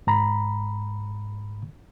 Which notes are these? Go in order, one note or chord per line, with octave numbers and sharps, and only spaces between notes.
G#2 A#5 B5